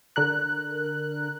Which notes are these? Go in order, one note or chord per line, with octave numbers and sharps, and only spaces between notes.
D3 A#4 F#6